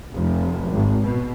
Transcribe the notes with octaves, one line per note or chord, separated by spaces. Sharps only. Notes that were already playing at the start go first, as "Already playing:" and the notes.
F1
G#1
B2